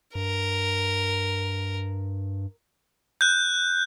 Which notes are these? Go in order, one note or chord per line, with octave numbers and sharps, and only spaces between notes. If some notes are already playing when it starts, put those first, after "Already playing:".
G2 A#4
F#6 G6